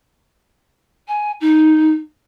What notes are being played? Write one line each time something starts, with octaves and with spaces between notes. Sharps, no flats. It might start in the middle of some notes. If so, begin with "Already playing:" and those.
G#5
D#4